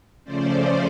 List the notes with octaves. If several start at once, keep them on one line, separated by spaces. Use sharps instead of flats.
C#3 F3 A3 C#4 C5 D5